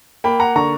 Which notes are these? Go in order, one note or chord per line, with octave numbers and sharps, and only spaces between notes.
A#3 G5 B5
F#5 A#5
D3 A#5 C#6